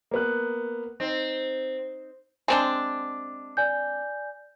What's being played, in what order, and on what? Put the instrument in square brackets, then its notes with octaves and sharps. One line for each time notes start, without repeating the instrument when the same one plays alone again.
[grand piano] A#3 B3 F#6
[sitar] C4 [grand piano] D#4
[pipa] G#3 C4 D4
[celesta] D5 G#5 G6